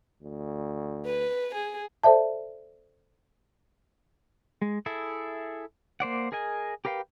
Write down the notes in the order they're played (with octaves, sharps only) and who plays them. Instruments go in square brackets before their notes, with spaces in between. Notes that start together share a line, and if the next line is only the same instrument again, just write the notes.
[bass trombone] D2
[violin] B4
G#4
[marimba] A4 C5 D5 E5 A5
[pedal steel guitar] G#3
E4 G#4 A4 E5
A#3 C5 D5 F#5
G#4 A#4 D#5 G#5
G4 A#4 B4 F5 G5